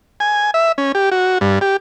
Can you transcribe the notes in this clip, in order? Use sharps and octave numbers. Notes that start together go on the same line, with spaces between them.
G#5
E5
C#4
G4
F#4
G2
G4